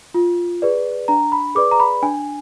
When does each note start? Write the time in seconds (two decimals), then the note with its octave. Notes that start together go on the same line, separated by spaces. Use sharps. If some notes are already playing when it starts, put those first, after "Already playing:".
0.14 F4
0.62 G#4 B4 D5
1.08 D4 A#5
1.32 B5
1.55 G#4 B4 D5 D6
1.71 A#5
1.80 B5
2.03 D4 G#5